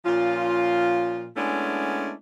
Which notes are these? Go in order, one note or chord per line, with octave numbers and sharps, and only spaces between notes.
A#2 F3 C#4 F4
G#3 A3 B3 C#4 D4 E4